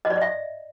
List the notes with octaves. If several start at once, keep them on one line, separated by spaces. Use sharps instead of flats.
D#5
D5
D#5
E5